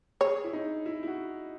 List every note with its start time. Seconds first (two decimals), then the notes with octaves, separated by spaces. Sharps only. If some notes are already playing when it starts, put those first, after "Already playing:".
0.21 G#4 C#5
0.44 E4
0.53 D#4
0.86 E4
1.03 E4
1.08 F#4